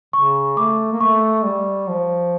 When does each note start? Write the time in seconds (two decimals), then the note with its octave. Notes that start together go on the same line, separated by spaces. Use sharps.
0.13 C#3 C#6
0.57 A3 D6
0.93 A#3
1.01 A3 C#6
1.45 G3
1.89 F3